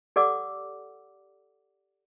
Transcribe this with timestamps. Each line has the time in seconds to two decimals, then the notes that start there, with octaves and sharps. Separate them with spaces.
0.16 G4 A4 D5 F#5 D6 E6